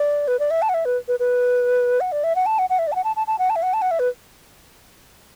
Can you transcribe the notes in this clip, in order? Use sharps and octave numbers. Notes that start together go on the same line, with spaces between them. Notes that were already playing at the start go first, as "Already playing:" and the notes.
Already playing: D5
B4
D5
E5
A5
F#5
E5
B4
B4
B4
F#5
D5
E5
F#5
A5
F#5
F#5
E5
D5
A5
F#5
A5
A5
A5
F#5
A5
E5
F#5
A5
F#5
E5
B4